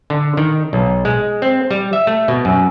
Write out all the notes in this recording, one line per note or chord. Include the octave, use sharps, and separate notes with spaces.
D3
D#3
B1
G#3
C4
G3
E5
A3
B2
F#2